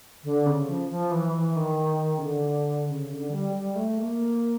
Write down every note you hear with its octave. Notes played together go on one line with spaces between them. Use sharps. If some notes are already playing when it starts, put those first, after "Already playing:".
D3
C#3
F3
F3
E3
E3
D#3
C#3
D3
C#3
D3
G3
G3
A3
A#3